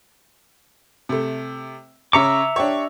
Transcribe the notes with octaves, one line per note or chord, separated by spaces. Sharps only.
C3 A3
C#3 C#5 E5 A#5 D6 C#7
D4 G4 C#5